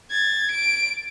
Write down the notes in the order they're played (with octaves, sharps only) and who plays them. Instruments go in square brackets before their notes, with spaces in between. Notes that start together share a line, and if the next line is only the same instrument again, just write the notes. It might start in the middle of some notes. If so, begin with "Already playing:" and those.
[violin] G#6 A6
D7